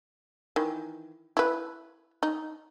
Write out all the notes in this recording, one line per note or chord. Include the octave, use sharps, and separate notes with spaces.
D#3 E3
E4 B4
D#4